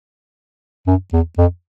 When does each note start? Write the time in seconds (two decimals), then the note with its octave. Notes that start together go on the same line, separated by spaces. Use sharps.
0.87 F#2
1.13 E2
1.38 F2